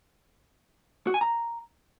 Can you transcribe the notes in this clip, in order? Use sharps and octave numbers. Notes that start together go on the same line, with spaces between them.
F#4
G#5
A#5